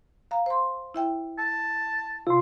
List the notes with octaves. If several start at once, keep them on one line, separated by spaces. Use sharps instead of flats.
F5 A#5
C5 C6
E4 E5 G5
A5
C3 F4 C6